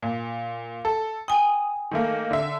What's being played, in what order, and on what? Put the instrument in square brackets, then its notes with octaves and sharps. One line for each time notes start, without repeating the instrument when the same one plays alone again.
[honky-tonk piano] A#2
A4
[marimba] G5 G#5 [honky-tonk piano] D#6
[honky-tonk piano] D#3 A3 A#3
D3 E5